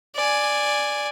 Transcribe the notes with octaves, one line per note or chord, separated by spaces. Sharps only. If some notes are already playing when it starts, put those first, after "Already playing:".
D5 G#5